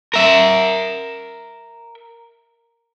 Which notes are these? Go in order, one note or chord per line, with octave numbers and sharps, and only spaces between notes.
A#4 E5